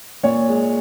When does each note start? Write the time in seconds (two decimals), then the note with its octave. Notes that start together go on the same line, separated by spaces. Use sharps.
0.23 A#2 C#5
0.48 G#3